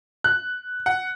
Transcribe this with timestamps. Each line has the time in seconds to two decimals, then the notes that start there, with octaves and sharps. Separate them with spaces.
0.24 F#6
0.86 F#5